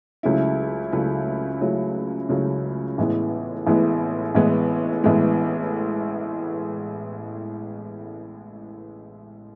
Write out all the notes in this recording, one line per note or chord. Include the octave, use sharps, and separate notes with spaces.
C#2 C#3 F#3 A3 E4
C#2 C#3 F#3 A3 E4
C#2 C#3 F#3 A3 E4
C#2 C#3 F#3 A3 E4
A1 A2 E3 G#3 B3
A1 A2 E3 G#3 B3
A1 A2 E3 G#3 B3
A1 A2 E3 G#3 B3